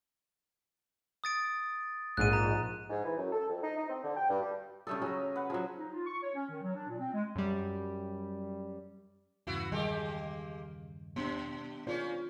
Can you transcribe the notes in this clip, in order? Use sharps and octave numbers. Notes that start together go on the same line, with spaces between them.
D#6 A6 D7
A#1 G#2 F#6 D#7
A#5
G#2
E3
F#2
A4
F2
D#4
D#4
C4
D3
G5
G2
G3
C#3 G3 A3 A4 E5 D#6
F#3 C#4 G#4 A#5
B4 F#5
F3 F#3 G#4
D#4
F4
C#6
C#5
C#4
D#3
F#3
D4
A#2
C4
G#3
F#2 G3
E2 G2 C#3 B3 E4 F#4
D#3 G3 G#3 A#3 G4 D#5
B2 B3 D4
A#3 C#4 D#4 F4 G#4 C5 D5 G6